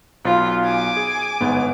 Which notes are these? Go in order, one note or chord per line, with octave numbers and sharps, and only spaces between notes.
B1 F4
G#5 D6
G#4
G1 G#2 B3